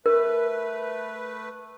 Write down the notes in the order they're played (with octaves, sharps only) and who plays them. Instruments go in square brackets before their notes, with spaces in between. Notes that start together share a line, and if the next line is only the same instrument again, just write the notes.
[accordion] A3 B4 [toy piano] A#4